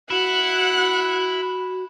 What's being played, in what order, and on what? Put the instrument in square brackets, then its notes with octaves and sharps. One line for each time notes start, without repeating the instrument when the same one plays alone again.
[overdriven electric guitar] E4 [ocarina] F#4 [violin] F#5 F#6